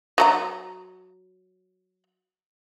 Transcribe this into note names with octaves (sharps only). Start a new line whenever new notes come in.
F#3 A4 A#5